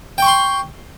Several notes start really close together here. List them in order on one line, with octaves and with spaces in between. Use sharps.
G5 C#6 C6